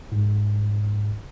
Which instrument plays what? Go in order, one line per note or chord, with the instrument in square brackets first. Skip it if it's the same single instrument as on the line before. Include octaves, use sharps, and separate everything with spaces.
[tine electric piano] G#2